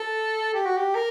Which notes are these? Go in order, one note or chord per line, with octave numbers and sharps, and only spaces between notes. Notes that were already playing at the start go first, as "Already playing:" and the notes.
Already playing: A4
G4
F#4
G4
A#4